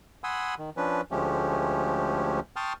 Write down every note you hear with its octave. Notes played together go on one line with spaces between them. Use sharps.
F#5 G#5 B5 C6 D#6 E6
D#3
F3 C#4 D4 B4
D2 F3 G#3 A3 C#4 G4
G5 A5 C6 C#6 D#6 F6